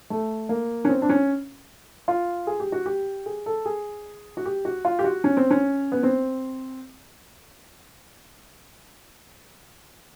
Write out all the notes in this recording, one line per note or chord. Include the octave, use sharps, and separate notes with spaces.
A3
A#3
C#4
C4
D4
C#4
F4
G#4
G4
F#4
G4
G#4
A4
G#4
F#4
G4
F#4
F4
G4
F#4
C#4
C4
C#4
B3
C4